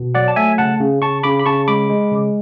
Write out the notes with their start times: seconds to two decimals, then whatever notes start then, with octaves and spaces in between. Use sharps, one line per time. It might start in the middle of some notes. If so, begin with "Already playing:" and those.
Already playing: B2
0.15 F#3 D5 F#5
0.28 A5
0.36 A3 E5 G#5
0.58 C#3 F#5 A5
0.80 C#3
1.02 C#3 A5 C#6
1.23 C#3 B5 D6
1.39 B5
1.46 C#3 A5 C#6
1.68 G#3 B5 D6
1.90 G#3
2.11 C#3